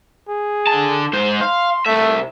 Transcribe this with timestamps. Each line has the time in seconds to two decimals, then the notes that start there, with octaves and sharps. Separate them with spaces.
0.29 G#4
0.67 D3 A5
1.13 G#2 C5
1.41 F5 C6
1.86 C2 A3 E5